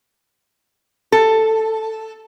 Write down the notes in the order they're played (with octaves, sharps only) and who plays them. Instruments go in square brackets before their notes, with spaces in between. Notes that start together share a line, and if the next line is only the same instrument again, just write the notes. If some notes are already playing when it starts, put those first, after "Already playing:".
[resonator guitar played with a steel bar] A4